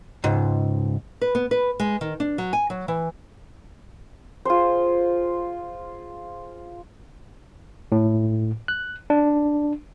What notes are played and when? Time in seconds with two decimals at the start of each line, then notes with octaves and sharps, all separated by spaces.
0.24 C#2 G#2
1.21 B4
1.35 B3
1.51 B4
1.80 G#3
2.01 D#3
2.20 D4
2.38 F#3
2.53 G#5
2.70 F#3
2.88 E3
4.45 F4 G#4 C5
7.92 A2
8.68 F#6
9.10 D4